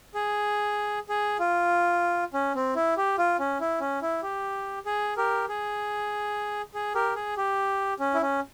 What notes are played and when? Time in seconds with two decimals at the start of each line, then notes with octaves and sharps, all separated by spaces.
0.14 G#4
1.09 G#4
1.39 F4
2.34 C#4
2.55 C4
2.75 E4
2.97 G4
3.18 F4
3.39 C#4
3.60 E4
3.80 C#4
4.02 E4
4.22 G4
4.86 G#4
5.17 G4 A#4
5.49 G#4
6.74 G#4
6.95 G4 A#4
7.16 G#4
7.37 G4
8.00 C#4
8.14 E4
8.21 C#4